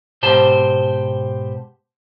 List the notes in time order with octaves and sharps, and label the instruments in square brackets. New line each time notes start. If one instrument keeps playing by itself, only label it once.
[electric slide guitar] G#2 B2 G4 C5 A5